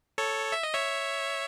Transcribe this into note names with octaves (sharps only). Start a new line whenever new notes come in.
A4 C#5
E5
D#5
C#5 E5